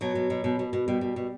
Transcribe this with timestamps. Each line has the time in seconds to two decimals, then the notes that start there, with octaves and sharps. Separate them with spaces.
0.01 B2 F#3
0.15 B2
0.30 B2
0.44 B2
0.59 B2
0.73 B2
0.88 B2 G3
1.01 B2
1.16 B2